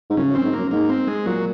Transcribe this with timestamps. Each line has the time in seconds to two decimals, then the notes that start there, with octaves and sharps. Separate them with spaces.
0.10 G#2
0.17 F#2 C#3
0.30 F#2
0.35 C4
0.44 G#2
0.53 F#2 A#3
0.71 G#2 A#3
0.89 C4
1.07 G#3
1.26 A#2 F#3